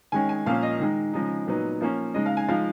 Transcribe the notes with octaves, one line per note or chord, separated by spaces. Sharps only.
D#3 G#3 C#4 G#5
G#5
A#2 F3 A#3 C#4 F5
D#5
D#3 G#3 D#4
C#3 F3 G#3 D#4
A#2 F#3 B3 D#4
F3 A#3 C#4
C#3 G#3 D#4 D#5
F5
G#5
F3 G#3 D#4 F5